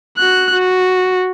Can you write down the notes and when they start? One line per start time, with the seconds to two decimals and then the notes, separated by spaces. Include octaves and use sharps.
0.17 F#4 F#6
0.53 F#4